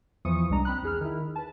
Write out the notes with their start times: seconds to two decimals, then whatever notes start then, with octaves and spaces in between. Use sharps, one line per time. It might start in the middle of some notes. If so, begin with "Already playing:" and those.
0.25 E2 E3 F3 C#6 D#6 C#7
0.50 C2 G#3 D4 A#5
0.65 C4 B5 F#6
0.83 E2 G#4 F6
1.01 D#3 E4
1.36 B4 A5